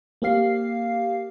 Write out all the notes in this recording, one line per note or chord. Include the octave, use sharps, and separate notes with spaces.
A#3 C4 G4 F5 C7